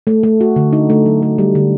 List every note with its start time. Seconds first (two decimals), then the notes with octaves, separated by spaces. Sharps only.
0.07 A3
0.23 A3
0.41 F#4
0.56 D3
0.73 D#4
0.90 A3
1.06 F#3
1.22 A3
1.38 G3
1.55 D3